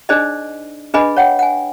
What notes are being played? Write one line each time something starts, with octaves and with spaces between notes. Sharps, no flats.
D4 D#4 G#4 C5 D5 D#5
D4 G#4 B4 D#5 G#5 B5
C#5 F#5 G5
F#5 G#5